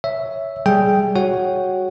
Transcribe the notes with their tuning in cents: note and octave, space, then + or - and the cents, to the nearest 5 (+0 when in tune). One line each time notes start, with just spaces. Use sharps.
C#5 +10 E5 +0
G3 +0 G#4 +10 G5 +0
F#4 +0 C#5 +0 F#5 +0